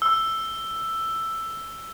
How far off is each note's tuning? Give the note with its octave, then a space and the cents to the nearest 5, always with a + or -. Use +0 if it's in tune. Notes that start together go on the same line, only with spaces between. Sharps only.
E6 +5